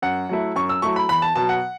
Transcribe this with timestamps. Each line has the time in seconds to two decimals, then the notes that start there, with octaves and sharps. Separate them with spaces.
0.02 F#2 F#5
0.29 F#3 A3 E4
0.56 F#2 C#6
0.69 E6
0.82 F#3 A3 E4 C#6
0.96 B5
1.09 E2 B5
1.22 A5
1.36 B2 F#3 A5
1.49 F#5